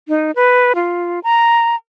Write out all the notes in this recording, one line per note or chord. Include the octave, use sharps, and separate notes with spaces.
D#4
B4
F4
A#5